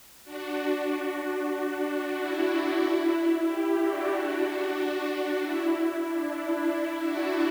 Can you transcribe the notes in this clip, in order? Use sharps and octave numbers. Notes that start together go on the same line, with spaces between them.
D4 F#4
E4
E4
E4 G4
D4 F#4
D4
E4
D4
E4
D4 F#4